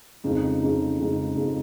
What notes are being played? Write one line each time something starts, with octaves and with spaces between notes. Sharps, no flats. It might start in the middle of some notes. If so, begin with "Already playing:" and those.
F2 C#3 G#3 D#4
F2 C#3 G#3 D#4
F2 C#3 G#3 D#4
F2 C#3 G#3 D#4